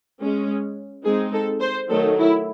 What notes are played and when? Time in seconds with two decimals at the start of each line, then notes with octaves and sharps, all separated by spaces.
0.21 G#3 C#4
1.04 G#3 C4 D#4 G#4
1.33 A4
1.61 C5
1.90 D#3 F#3 A3 D#4 A4
2.17 E4